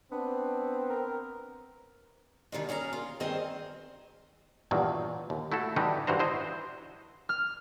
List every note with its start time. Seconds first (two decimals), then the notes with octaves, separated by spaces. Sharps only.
0.12 B3 C4 D4
0.89 A#4
2.52 D3 D#3 G3 G#3
2.69 C#4 G#4 A#4 A#5
2.93 F4
3.20 G2 D#3 C4 G#4 C5 D#5
4.71 E2 G2 A#2 D#3 F#3
5.30 D#2
5.52 A3 E4 F#4 A4
5.76 D3 E3 G3 D#4 F#4 G4
6.07 G2 E3 F#4 C5 A#5
6.20 E4 C5 D#5
7.29 F6